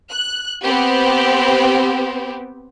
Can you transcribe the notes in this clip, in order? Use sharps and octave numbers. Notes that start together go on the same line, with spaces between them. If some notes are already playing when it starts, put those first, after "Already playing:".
F#6
B3 C4 G4